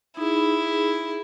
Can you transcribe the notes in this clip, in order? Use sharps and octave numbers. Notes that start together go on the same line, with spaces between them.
D#4 E4 G#4